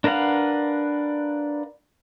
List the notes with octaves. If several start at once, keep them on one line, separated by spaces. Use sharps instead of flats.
D4 A#4 B4 F5 F#5